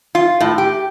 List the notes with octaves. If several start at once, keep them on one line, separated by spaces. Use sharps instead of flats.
F4
A2
G4